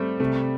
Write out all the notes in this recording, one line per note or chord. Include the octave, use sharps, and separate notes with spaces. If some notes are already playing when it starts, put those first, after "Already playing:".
Already playing: G3 A3 C4
C3 A3